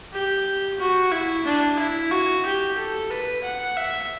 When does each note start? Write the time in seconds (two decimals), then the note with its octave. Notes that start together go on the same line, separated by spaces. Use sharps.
0.13 G4
0.79 F#4
1.12 E4
1.45 D4
1.78 E4
2.11 F#4
2.45 G4
2.77 A4
3.10 B4
3.44 F#5
3.77 E5